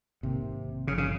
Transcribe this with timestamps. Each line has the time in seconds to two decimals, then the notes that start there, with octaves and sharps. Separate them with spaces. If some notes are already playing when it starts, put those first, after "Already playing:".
0.22 A#1 G#2 C3 D#3 A#3
0.87 G#1 G2 C#3 F3
0.98 C#3